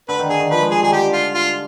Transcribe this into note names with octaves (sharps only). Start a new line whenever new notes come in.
D3 B4
D#3
D3 G#4
D#3
F3 B4
G#3
G3 G#4
D#3 G#4
D3 G4
F4
F4